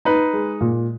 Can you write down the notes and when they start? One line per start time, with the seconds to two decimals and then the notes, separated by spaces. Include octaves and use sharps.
0.05 D#4 B4
0.33 G#3
0.61 A#2